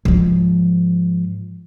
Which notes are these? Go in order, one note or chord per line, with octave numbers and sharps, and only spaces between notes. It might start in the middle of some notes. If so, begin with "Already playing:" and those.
G#2 F3